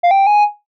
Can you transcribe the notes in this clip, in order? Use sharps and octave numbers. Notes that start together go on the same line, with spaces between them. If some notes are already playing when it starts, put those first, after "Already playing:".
F5
G5
G#5